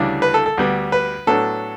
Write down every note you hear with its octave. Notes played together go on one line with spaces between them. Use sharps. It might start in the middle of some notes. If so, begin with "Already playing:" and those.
Already playing: D2 C#3 E3 G3 D4
B4
A4
A4
D2 D3 G3 B3
B4
A2 F#3 B3 D4 A4